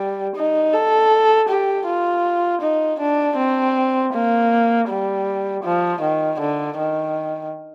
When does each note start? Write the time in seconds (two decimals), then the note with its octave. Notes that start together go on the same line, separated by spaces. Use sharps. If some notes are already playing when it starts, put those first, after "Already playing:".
Already playing: G3
0.36 D#4
0.73 A4
1.48 G4
1.87 F4
2.62 D#4
3.00 D4
3.37 C4
4.13 A#3
4.89 G3
5.64 F3
6.02 D#3
6.40 D3
6.78 D#3